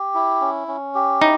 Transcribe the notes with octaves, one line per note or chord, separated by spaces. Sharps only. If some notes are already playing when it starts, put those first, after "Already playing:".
Already playing: G4
E4
C#4
C#4
G4
D#4 E4